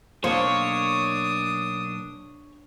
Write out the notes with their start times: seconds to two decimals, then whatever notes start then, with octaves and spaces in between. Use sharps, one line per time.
0.24 B1 A#3 D4 C5 C#5 D#6